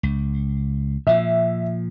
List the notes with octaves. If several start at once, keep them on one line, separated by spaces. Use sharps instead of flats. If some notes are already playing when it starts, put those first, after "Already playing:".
C#2
A#2 F3 E5